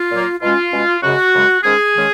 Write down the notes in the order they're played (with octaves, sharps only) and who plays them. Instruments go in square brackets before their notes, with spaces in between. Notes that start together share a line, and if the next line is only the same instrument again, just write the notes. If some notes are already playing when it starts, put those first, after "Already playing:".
Already playing: [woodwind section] F4
A#2 F#3 A#3
B2 G#3 C#4 F4
B2 G#3 C#4
F#2 C#3 G#3 F#4
F#2 C#3 G#3
G#2 D#3 G#3 C#4 G#4
D#3 G#3 C#4